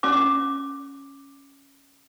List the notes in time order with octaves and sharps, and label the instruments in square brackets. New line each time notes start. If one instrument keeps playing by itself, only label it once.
[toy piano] C#4 D6